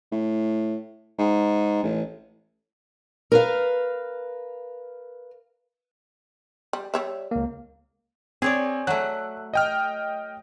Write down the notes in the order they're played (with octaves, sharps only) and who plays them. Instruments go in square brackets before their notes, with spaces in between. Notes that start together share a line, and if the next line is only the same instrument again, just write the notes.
[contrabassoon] A2
G#2
A1
[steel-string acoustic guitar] A#4 B4 F5
[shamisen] G3
G3 C#5 E5
[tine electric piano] C#2 A#3
[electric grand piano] C4 [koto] G#4 C#5 D5
[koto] F#3 A3 [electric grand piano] F#6
[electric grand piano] D#5 G5 F6